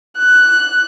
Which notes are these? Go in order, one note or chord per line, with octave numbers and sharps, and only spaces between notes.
F#6